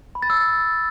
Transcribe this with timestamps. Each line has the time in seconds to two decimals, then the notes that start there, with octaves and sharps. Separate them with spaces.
0.15 B5
0.22 A6
0.30 E6